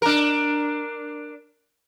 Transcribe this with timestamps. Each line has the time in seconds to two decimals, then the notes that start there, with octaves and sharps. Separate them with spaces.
0.02 D4 A#4